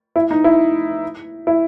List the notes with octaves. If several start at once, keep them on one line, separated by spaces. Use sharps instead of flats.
E4
D#4
E4
E4